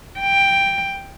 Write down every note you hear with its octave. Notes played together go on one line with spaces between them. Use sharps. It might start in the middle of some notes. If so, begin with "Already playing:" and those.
G5